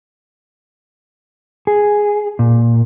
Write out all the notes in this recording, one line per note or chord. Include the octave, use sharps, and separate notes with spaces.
G#4
A#2